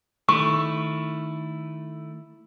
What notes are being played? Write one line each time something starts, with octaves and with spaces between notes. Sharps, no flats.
D#3 A3 E4 C#6